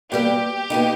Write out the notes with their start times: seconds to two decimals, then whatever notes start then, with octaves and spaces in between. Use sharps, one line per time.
0.12 B2 G3 A#3 G4
0.70 B2 A#3 D#4